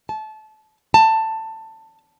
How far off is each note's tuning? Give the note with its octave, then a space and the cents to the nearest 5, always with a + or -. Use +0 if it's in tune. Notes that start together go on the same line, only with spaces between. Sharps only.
A5 -25
A5 +15